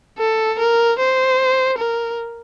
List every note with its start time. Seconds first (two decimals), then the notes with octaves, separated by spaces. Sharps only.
0.18 A4
0.59 A#4
0.99 C5
1.78 A#4